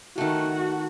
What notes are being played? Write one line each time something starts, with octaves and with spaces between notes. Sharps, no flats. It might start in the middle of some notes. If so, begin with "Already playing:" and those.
D#3 A3 F#4